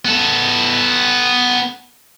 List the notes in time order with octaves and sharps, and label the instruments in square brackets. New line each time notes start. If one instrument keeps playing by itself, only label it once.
[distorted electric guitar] B3 A4